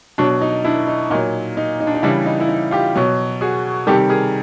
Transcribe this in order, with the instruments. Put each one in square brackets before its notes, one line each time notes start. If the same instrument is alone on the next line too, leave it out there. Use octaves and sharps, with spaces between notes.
[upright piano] B2 F#3 D4
D#4
D4 E4
D#4
A#2 F#3 D#4
D#4
D#4
D4
D#4
C#3 E3 G3 D4 E4
D#4
E4
D#4
F4 G4
B2 F#3
F#4 G#4
C3 D#3 G3 G4 A4
G#4 A#4